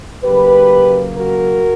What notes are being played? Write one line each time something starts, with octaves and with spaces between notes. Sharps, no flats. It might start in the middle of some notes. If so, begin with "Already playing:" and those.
C#3 F#3 A#3 G4 B4
F#4 A#4